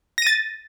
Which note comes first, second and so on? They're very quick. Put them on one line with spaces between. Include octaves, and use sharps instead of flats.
A#6 D#7 A6